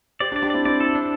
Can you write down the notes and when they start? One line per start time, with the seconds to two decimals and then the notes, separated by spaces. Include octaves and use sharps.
0.20 G4 C5 D5
0.31 D4 G4
0.36 D5
0.42 D4 G4
0.50 C4 E4 D5
0.65 C4 E4 D5
0.80 A4
0.95 D4